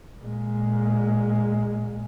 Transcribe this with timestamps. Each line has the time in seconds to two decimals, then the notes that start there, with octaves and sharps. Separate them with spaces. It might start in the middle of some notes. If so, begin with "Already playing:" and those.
0.23 A#2 G#3